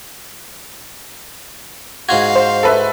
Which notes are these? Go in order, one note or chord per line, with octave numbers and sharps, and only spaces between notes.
G#2 F4 F#4 F5 G#6
C5
A4 B4 E5